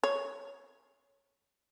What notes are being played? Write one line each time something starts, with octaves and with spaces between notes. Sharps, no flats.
C#5